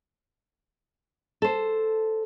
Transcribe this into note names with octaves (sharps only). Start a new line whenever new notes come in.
A4 C5